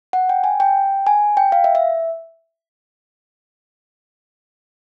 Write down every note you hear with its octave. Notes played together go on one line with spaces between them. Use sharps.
F#5
G5
G#5
G5
G#5
G5
F5
E5
E5